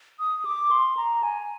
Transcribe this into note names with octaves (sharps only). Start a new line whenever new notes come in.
D#6
D6
C6
A#5
G#5